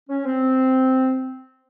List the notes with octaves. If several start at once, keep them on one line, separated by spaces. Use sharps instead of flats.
C#4
C4